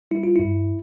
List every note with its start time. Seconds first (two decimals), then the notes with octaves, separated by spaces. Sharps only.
0.11 G3 E4
0.23 F4
0.36 G2 E4